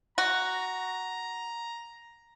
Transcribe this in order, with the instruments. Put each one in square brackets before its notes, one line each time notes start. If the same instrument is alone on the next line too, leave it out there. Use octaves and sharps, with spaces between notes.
[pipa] F#4 [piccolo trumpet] A#5